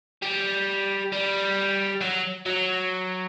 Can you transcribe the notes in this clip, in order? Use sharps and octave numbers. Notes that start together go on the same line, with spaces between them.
G3
G3
F#3
F#3